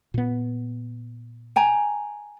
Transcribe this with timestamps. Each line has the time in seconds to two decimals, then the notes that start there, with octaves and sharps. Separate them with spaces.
0.14 A#2 B3
1.56 G5 G#5 A#5